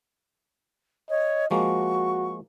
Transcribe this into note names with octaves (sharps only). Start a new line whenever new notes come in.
C#5 D#5
F3 G#3 A#3 F#4 C#6